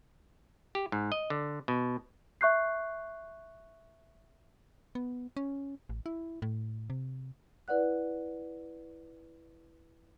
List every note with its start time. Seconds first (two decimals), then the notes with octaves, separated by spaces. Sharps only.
0.75 G4
0.92 G#2
1.12 D#5
1.30 D3
1.68 B2
2.41 E5 C#6 F#6 G6 C7
4.95 B3
5.37 C#4
5.89 A1
6.06 E4
6.42 A2
6.90 C3
7.68 E4 B4 D5 F#5 F#6